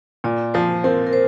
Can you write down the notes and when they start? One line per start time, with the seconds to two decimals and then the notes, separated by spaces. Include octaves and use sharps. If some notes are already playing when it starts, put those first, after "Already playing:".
0.24 A#2 D5
0.54 F3 C5
0.84 C4 A#4
1.07 A#4
1.13 C5